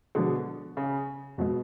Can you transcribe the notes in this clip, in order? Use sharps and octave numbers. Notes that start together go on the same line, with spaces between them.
B2 D3 F3 G#3 D4 G#4
C#3
F2 B2 F3 G#3